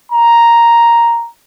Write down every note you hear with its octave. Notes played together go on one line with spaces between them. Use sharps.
A#5